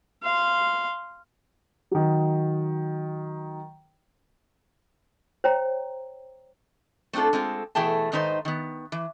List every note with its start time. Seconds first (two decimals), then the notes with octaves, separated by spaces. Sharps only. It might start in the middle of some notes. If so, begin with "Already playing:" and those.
0.24 F5 C6
1.91 D#3 F#3
5.44 C5 C#5 G5 A#5
7.13 A3 C4 D4 F4 A4
7.33 G#3 C4 F4 A4
7.75 B2 E3 A3 G#4 G5 A5
8.12 G#2 D#3 D#4 B4 C5
8.45 D#3 B3
8.92 E3